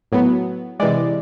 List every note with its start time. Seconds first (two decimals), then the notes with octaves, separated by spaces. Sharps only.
0.12 A2 F#3 B3
0.80 C3 E3 G#3 D5